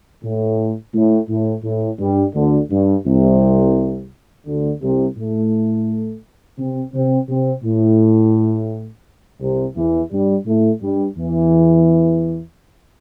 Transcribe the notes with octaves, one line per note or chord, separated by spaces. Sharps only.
A2
A2
A2
A2
G2 G3
D2 D3
G2
C2 C3
D2 D3
C2 C3
A2 A3
C3 C4
C3 C4
C3 C4
A2
C2 C3
E2 E3
G2 G3
A2 A3
G2 G3
E2 E3